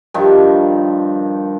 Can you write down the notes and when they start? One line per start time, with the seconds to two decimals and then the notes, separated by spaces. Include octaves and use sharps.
0.14 G2 D#3 F3